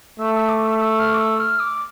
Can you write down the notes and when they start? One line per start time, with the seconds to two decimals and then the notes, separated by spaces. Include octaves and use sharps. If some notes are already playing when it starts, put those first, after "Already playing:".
0.19 A3 E6
0.35 E6
0.49 D6
0.65 E6
0.80 E6
0.99 F6
1.13 D6
1.20 E6
1.40 F6
1.60 D6